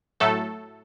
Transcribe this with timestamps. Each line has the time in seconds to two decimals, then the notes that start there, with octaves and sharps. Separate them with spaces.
0.20 A2 F#3 A3 A4